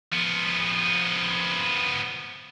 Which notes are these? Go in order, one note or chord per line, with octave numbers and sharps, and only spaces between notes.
F3 B3